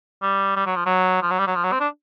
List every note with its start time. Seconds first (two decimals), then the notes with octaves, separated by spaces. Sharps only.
0.22 G3
0.56 G3
0.66 F#3
0.76 F3
0.86 F#3
1.22 F3
1.31 F#3
1.39 G3
1.47 F#3
1.55 F3
1.64 F#3
1.72 C4
1.80 D4